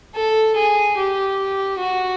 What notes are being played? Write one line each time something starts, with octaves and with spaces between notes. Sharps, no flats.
A4
G#4
G4
F#4